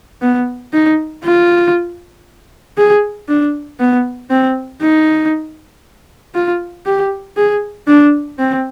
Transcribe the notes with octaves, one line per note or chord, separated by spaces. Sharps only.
B3
D#4
F4
G#4
D4
B3
C4
D#4
F4
G4
G#4
D4
C4